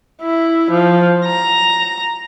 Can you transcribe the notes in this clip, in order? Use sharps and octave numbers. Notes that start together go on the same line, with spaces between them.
E4
F3
A#5